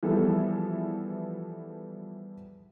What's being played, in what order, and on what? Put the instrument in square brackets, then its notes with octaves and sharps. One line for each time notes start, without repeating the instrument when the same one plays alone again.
[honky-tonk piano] E3 F3 G3 B3 G#4 A4